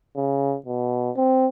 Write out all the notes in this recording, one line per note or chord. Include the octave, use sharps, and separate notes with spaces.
C#3
B2
C4